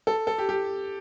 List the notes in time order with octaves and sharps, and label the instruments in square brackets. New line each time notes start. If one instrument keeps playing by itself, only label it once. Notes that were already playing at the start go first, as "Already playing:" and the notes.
[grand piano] A4
A4
G4
G4